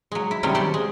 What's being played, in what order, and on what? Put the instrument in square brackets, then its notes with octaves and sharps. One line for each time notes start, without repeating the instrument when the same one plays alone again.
[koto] F#3 G#3
E4
C3 D#3 F#3 G3 C4 C#4
C#4 G4 C5 D5 A5
G#3